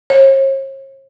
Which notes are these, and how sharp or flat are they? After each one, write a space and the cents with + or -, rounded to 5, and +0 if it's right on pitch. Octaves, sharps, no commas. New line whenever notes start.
C#5 -45